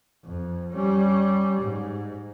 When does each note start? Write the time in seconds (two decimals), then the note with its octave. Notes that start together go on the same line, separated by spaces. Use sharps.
0.25 F2
0.72 G3 C#4
1.61 G#2